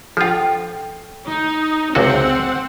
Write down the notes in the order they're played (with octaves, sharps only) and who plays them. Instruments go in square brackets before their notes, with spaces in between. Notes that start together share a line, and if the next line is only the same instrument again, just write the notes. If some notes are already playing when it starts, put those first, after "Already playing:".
[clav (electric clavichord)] F3 F4 [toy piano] A4 G5
[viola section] D#4
[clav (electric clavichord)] C#2 C3 F#4 [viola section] C4 F#5